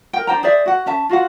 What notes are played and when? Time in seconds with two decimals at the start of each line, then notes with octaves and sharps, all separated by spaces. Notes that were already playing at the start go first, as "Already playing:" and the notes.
0.13 A#4 G5
0.27 D4 C5 G5 A#5
0.43 G#4 C5 D5 E5
0.66 F#4 F#5
0.86 C#4 E5 A5
1.09 F4 F#4 F5 F#5